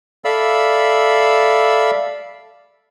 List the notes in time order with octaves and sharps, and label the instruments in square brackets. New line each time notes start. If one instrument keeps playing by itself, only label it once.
[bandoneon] A4 D5 E5 F5 B5 E6